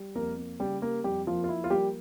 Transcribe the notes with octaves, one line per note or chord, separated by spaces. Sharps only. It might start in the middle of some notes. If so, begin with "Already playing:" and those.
Already playing: G3
F2 A#3 A#4
A#3
C#3 G3 G4
G3 A#3 A#4
F2 G3 G4
F3 A#3 F4
F4
F3 E4
F4
G3 A#3 G4